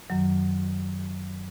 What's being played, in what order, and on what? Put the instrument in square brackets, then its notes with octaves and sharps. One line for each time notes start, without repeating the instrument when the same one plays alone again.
[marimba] F#2 D#3 F#3